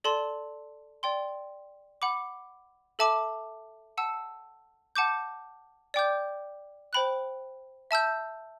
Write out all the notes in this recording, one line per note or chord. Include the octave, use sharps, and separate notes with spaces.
A4 D5 A5 C6
D5 G5 C6
F#5 B5 D6
A4 E5 A5 D6
F#5 A5 E6
F#5 A5 D6 G6
D5 G5 D6 G6
C5 G5 B5 F#6
E5 A5 E6 G6